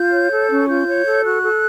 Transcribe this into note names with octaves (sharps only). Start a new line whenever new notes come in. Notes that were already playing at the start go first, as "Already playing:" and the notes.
Already playing: F4 G6
C#5
A4
C#4
F4 G6
C#5
A4
F#4 F#6
A4